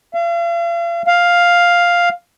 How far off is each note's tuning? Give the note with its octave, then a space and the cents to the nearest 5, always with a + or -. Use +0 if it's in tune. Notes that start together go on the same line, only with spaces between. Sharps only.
F5 -40
F5 +5